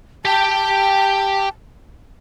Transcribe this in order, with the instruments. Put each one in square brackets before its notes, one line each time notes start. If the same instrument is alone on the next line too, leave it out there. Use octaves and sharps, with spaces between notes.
[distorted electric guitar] G4 G5 [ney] A5